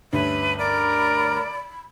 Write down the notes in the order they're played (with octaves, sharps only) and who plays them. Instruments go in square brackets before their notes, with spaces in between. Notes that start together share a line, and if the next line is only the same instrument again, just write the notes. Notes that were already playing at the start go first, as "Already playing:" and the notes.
[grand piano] D2 G2 C#4 [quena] B4 [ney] E5
[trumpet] A#4 [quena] D5 [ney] B5